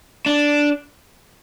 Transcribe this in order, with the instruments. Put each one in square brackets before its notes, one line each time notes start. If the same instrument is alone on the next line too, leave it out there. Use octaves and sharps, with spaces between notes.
[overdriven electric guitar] D4